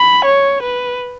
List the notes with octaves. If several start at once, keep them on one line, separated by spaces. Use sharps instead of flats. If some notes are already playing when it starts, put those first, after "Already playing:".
Already playing: B5
C#5
B4